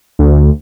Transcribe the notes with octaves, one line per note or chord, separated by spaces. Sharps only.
D2